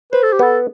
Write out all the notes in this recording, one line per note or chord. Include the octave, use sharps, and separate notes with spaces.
B4 C5
A4
G4
B3 A4